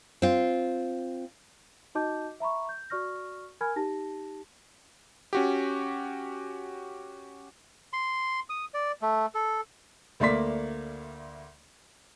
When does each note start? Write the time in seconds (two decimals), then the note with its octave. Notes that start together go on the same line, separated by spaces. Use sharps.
0.22 C4 F4
1.95 D#4 F#4 D#5 A5 D6 G6
2.40 E5 A#5 B5 C#6
2.69 G6
2.90 F#4 D5 C#6 F6 A#6
3.61 A#4 G#5 B5 F6 G#6
3.76 D#4 G4 A5 A#6
5.33 C#4 F#4 G4
7.93 C6
8.49 D#6
8.74 D5
9.02 A3
9.35 A4
10.20 D2 A3 A#3 D5 C6 B6